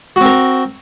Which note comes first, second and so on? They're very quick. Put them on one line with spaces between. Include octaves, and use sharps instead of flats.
F#4 C4 A#4